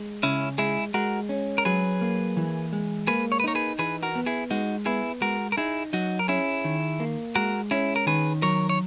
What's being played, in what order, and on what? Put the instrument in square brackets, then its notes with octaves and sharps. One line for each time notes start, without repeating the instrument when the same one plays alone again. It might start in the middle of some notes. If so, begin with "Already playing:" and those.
Already playing: [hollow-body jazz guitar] G#3
[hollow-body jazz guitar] C#3 [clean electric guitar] C#4 E4
[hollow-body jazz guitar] G#3 [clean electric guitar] E4 G#4
[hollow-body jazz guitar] G#3 [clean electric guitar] F#4 A#4
[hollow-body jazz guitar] C#4
[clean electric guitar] A#4
[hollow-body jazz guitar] F#3 [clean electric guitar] G#4 B4
[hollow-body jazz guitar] A#3
E3
G#3
[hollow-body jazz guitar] A#3 [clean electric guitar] G#4 B4
[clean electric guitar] C#5
B4
[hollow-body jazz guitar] D#4 [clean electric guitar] A#4 C#5
[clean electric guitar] G#4 B4
[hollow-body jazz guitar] E3 [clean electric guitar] G#4 B4
[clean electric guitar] F#4 A#4
[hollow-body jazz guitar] B3
[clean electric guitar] E4 G#4
[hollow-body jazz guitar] G#3 [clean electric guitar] D#4 F#4
[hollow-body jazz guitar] B3 [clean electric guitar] E4 G#4
[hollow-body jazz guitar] G#3 [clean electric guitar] F#4 A#4
[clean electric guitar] A#4
[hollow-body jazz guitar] D#4 [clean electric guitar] E4 G#4
[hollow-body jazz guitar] F#3 [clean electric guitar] D#4 F#4
[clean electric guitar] A#4
[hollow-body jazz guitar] C#4 [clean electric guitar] E4 G#4
[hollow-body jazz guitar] D#3
A#3
[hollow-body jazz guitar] G#3 [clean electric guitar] F#4 A#4
[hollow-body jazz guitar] C#4 [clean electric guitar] E4 G#4
[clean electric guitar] A#4
[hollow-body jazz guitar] D#3 [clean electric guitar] G#4 B4
[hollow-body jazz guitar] F#3 [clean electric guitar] A#4 C#5
[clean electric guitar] C#5